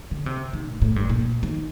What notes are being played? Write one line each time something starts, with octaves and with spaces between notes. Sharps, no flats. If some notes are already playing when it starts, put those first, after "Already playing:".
D3
C3
D#3
A2
A2
G2
A#2
D#3